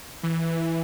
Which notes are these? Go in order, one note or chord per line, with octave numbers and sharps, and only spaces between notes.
E3